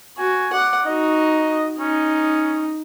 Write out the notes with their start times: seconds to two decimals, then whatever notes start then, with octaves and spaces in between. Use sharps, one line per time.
0.18 F#4 G#5
0.53 D5 F#5
0.86 D#4 F#4 D#5
1.79 C#4 D#4